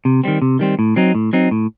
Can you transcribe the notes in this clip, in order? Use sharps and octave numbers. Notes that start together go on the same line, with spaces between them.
C3
D#3 G3 C4
C3
D#3 G3 C4
A2
F#3 C4 D#4
A2
F#3 C4 D#4
A2